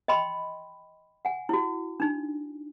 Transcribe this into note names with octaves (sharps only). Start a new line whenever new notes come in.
D#5 G5 B5 C6
F#5 G#5
E4 F#4
D4 D#4